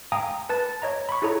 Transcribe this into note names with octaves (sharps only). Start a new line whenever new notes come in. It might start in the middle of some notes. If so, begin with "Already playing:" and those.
F5 G5 G#5 A#5 D#6
B4 A5 A6
C#5 D#5 A#5
B5 C#6
E4 F4 G#4 A4 C#5 A#5